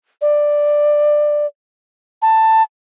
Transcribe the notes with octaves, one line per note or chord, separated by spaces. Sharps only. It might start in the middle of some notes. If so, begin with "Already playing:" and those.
D5
A5